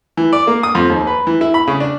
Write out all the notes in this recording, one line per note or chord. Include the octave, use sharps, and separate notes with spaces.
E3
D5
A#3
D#6
F2
D#2
B4
E3
E4
B5
C#3
D4